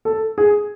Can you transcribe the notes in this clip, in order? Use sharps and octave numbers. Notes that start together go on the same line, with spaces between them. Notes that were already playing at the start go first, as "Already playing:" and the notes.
A4
G#4